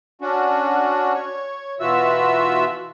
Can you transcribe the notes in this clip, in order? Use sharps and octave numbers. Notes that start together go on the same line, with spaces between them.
C#4 D4 F#4
C#5
B2 E3 F4 F#4 E5 E6